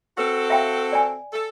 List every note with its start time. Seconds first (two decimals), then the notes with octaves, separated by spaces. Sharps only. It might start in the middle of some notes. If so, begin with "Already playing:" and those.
0.18 C4 F#4 A4 B4
0.50 E5 F5 G5
0.92 D5 G#5
1.33 A4